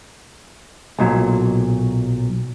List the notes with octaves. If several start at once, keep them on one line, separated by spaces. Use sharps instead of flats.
B1 A#2 F#3